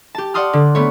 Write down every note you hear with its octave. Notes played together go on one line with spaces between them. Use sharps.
G4 A5
D5 F#5 A5 C6 D#6 F6
D3
A3 B3 C#5